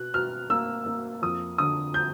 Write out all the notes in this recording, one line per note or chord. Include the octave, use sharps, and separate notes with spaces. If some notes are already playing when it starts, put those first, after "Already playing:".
Already playing: B2 F#6
B2 F6
A#3 E6
A#3
F2 D#6
D3 D#6
G6